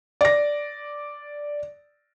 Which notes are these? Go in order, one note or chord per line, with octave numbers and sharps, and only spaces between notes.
D5 A#6